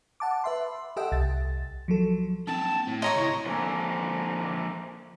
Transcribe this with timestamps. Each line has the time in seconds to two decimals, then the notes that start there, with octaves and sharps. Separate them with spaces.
0.20 F#5 A5 D6
0.44 B4 E5 C6
0.96 G4 A4 D#5 E5 F#5 G5
1.12 C2 A6
1.88 F3 F#3 A4
2.47 A#3 C4 A5
2.87 A2
3.02 G#2 C#5 D#5 A#5 C6 C#6
3.16 C#2 E4
3.46 D3 F3 A#3 C#4 D4 A4